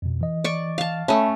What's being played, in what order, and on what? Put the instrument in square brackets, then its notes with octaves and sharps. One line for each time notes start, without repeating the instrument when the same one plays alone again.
[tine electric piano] F2 B2
E3 D#5
[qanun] D5 C#6
F5 A5
[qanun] A3 C#4 [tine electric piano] E5 A5 B5